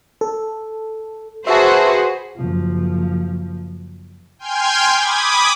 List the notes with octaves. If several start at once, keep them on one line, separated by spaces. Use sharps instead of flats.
A4
F#4 G#4 B4 C5 E5 A5
F#1 F3
G5 G#5 C6 F6 G6 G#6
B5 D6 D#6 G#6